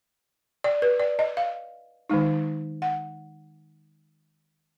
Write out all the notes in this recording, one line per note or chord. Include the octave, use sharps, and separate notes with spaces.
D5
B4
D5
D#5
F5
D#3 G#3 D#4
F#5